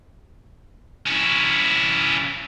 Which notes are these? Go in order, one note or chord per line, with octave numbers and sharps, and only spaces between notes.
C#4 E4